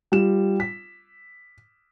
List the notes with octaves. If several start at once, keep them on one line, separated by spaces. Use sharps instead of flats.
G3 F4 E7
B6